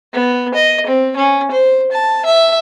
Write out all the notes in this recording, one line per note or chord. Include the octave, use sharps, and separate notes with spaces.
B3
D#5
C4
C#4
C5
A5
E5